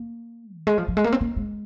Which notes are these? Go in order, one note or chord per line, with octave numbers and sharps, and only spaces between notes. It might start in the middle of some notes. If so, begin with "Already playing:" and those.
Already playing: A#3
D#3
G#3
F3
F3
G#3
A#3
C4
A#3
G#3